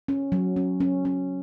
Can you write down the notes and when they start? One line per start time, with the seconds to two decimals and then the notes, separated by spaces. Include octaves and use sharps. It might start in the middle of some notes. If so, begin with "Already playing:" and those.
0.08 C#4
0.32 F#3
0.56 C#4
0.80 C#4
1.05 C#4